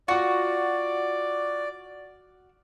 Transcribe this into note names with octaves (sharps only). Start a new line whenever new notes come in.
F4 F#4 D5 F#5 C#6